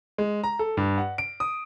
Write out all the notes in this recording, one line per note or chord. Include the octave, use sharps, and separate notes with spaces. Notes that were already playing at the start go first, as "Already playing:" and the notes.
G#3
A#5
A4
G2
F#5
D7
D#6